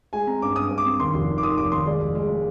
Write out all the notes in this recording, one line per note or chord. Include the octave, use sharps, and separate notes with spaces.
G#3 G#5
C4 A#5
G2 D6
G2 D#6
G2
D6
C4
D#2 C6
F1
D#3
D6
D#3 D#6
F1 D6
D#2 C6
G#3 D5
F1
G#3
G#3